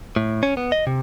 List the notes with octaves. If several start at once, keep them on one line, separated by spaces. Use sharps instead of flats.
A2
C#4
B3
D#5
C3